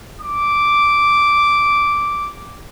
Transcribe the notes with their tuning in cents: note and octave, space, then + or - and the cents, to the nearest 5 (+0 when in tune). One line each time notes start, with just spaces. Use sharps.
D6 -5